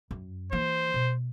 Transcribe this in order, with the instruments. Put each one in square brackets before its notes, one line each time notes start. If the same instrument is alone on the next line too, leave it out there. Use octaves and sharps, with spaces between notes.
[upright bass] F#2
[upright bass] E3 A#3 [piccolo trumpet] C5
[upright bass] B2